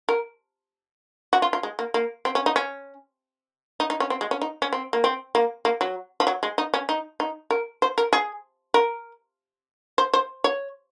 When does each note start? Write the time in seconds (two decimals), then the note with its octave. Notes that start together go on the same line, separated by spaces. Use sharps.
0.09 A#4
1.33 F#4
1.42 F4
1.53 F4
1.63 G#3
1.79 A#3
1.94 A#3
2.25 C4
2.35 C#4
2.46 D#4
2.56 C#4
3.80 D#4
3.90 D#4
4.00 C#4
4.10 C4
4.21 G#3
4.31 C#4
4.42 D#4
4.62 C#4
4.73 C4
4.93 A#3
5.04 C4
5.35 A#3
5.65 A#3
5.81 F#3
6.20 F3
6.27 F#3
6.43 G#3
6.58 D#4
6.74 C#4
6.89 D#4
7.20 D#4
7.51 A#4
7.82 C5
7.98 A#4
8.13 G#4
8.74 A#4
9.98 C5
10.13 C5
10.44 C#5